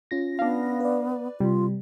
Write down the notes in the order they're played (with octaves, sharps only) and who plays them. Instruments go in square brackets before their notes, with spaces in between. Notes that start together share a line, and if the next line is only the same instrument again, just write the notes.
[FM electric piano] C#4 F4 A#6
[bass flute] B3 [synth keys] D4 F5
[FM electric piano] B4 D5
[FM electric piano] C3 [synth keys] G3 [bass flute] F4